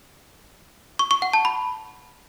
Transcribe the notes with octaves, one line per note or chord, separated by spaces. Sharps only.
C#6
C#6
F#5
A5
B5